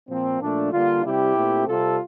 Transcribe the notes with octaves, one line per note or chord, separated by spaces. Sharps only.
A#2 F3 A#3 C4
A#2 F3 A3 D4
D3 G3 A#3 D4 F4
C3 G3 C4 E4 G4
A#2 A3 C4
C3 G3 C4 F4 A4